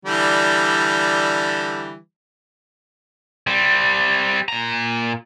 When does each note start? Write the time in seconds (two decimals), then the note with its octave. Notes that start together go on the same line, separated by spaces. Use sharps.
0.05 D3 E3 G3
3.47 G3 C4
4.48 A#2 A#5